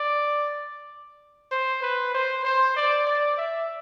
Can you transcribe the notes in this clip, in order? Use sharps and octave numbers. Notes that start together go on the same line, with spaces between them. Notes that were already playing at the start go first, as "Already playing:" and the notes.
Already playing: D5
C5
B4
C5
C5
D5
D5
E5